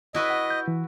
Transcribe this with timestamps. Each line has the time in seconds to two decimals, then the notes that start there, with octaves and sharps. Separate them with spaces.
0.15 E4 F#4 B4 D#5
0.30 F#5
0.50 G6
0.68 E3